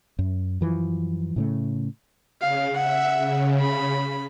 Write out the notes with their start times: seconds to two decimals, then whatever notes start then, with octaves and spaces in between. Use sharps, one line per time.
0.19 F#2
0.61 F#2 E3 F3
1.36 A2 C#3 A3
2.41 C#3 F5
2.75 E5 F#5
3.18 C#3
3.60 B5